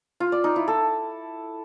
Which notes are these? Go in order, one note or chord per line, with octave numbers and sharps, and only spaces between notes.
F4
D5
D#4
E4
A4